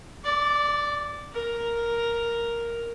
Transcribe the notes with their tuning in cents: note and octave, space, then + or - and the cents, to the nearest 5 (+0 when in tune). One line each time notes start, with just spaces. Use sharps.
D5 +0 D6 -35
A#4 +0 A#5 +0